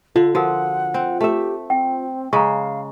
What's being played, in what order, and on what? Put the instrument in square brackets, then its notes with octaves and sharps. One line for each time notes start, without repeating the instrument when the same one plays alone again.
[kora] D3 [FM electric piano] F4 [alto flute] A4
[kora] F3 [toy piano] F#4 A#4 [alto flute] F#5
[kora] C4
[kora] A3 E5 [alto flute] G4
[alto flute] C4 [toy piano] G5
[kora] C#3 G#3 [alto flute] F5 [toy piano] A#5 C#6